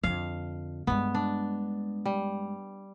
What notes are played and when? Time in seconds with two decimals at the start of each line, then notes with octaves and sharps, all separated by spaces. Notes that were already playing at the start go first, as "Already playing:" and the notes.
0.03 F2 D3 F5
0.87 G2 G#3 B3
1.15 D4
2.05 G3